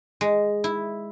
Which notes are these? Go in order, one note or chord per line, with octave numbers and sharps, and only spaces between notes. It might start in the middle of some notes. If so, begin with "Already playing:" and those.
G#3
E4